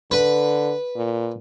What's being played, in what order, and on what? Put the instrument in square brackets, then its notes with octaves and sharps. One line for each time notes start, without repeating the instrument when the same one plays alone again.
[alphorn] D3 [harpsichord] B4
[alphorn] A#2